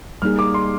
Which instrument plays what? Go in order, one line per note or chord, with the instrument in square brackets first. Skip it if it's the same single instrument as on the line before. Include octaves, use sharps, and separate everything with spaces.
[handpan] G3 A#3 D#4 G#4 [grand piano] F6
[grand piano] D6
C6